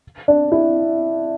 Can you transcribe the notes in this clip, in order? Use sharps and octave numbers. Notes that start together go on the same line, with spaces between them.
D4
E4